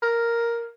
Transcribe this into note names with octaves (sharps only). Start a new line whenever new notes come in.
A#4